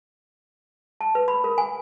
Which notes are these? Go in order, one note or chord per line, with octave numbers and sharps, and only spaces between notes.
A5
B4
B5
A#4
G#5